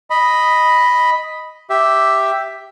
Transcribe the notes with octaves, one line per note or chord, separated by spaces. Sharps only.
D#5 B5
G4 E5